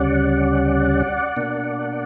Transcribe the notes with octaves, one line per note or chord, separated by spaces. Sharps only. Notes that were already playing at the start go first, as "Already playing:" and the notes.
Already playing: D2 C#3 G3 C#4 D5 F#5
B2 A#3 D4